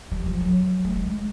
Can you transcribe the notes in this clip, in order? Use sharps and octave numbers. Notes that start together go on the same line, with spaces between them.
G3
F3
F#3
A3
G#3